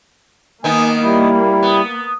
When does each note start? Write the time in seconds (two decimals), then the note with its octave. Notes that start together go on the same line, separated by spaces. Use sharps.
0.64 D#3 A#3 B3 D#4 G#5
1.03 G3 E4
1.63 B3